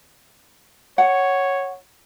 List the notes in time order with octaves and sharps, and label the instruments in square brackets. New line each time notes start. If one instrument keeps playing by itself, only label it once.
[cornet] C#5 [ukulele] F#5